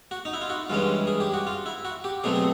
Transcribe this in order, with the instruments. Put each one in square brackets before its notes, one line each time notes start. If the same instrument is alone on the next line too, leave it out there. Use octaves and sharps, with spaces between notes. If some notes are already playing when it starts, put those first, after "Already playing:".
[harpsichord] F#4
D#4
E4
F4
F#4
G2 E3 G#3 C#4 F4
G#4
G4
F#4
F4
E4
F#4
G4
B2 F#3 A3 C4 G#4
G#4